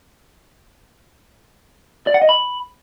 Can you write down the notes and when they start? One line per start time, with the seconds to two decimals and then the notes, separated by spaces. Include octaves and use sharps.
2.07 D5
2.14 F#5
2.22 D#5
2.29 B5